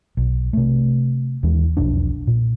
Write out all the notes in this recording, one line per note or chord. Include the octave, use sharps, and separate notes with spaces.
B1
C3 A3
D#2 E3 G#3
E1 B1 F2 D4
A#2